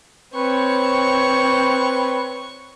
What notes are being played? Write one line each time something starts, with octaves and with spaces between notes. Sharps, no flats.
C4 B4 C#5 C#6